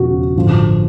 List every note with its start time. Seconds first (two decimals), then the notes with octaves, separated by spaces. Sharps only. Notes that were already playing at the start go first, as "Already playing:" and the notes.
Already playing: E1 E2 C#3 F3 F#4
0.35 A1 G2 D3 F3